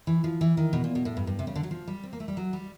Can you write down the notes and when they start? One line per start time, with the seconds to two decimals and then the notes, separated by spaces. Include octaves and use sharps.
0.07 E3
0.24 F3
0.41 E3
0.57 D#3
0.73 B2
0.84 A#2
0.95 B2
1.05 A2
1.17 G2
1.27 G2
1.39 C3
1.47 C#3
1.56 D3
1.63 F#3
1.71 F3
1.88 G3
2.03 C4
2.13 A#3
2.20 A3
2.28 G3
2.37 F#3
2.53 G3